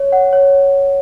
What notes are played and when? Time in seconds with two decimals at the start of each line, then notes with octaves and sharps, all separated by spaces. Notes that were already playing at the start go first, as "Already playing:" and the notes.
Already playing: C#5
0.12 F#5
0.33 C#5